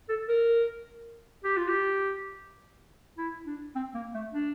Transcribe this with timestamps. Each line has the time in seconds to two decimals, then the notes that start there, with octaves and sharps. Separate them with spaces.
0.09 A4
0.29 A#4
1.44 G4
1.57 F4
1.68 G4
3.18 E4
3.46 D4
3.75 C4
3.94 A#3
4.14 A3
4.33 D4